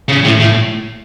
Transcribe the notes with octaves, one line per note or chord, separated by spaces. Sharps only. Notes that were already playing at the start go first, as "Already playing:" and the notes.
C#3
A2
A2